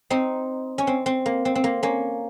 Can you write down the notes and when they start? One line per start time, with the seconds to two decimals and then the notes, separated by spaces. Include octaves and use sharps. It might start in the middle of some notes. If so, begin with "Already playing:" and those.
0.10 C4 D#4
0.78 C#4
0.87 C4
1.06 C4
1.26 A#3
1.45 C4
1.55 C4
1.64 A#3
1.83 A#3 C#4